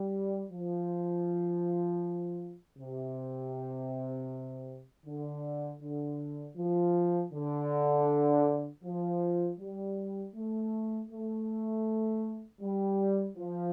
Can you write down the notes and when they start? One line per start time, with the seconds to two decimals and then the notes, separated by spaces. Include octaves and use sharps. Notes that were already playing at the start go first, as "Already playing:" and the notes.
Already playing: G3
0.52 F3
2.78 C3
5.06 D3
5.81 D3
6.57 F3
7.32 D3
8.84 F3
9.59 G3
10.34 A3
11.09 A3
12.61 G3
13.37 F3